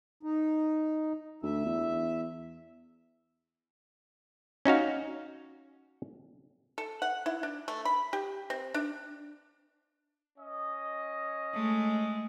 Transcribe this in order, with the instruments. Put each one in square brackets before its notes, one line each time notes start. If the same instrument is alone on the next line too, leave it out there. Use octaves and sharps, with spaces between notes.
[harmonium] D#4
[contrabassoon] D2 [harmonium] E5
[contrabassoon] E2
[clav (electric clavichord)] C#4 D#4 F#4 F5
[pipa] A4
F#5
E4
D4
A3
B5
G4
C4
D4
[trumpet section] C#4 D#5
[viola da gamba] G#3 A3